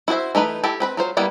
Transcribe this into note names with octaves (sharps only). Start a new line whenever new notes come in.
E4 F#4 G#4 C5 E5
E3 A3 D#4 B4
E4 G4 A4
C4 B4 B5
F#3 F4 C5
G3 A#3 B3 E4